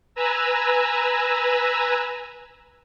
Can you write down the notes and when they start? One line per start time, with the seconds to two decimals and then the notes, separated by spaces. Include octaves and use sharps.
0.15 B4 G#5 A#5 E6